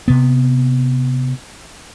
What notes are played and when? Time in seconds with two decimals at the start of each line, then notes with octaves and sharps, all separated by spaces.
0.08 C3 B3